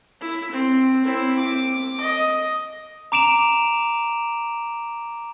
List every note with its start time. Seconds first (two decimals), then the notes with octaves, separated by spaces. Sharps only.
0.21 E4
0.52 C4
1.04 C4 E4
1.39 D6
2.01 D#5
3.12 A#5 D6 D7 E7 F7